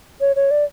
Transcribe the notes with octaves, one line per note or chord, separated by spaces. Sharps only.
C#5
C#5
D5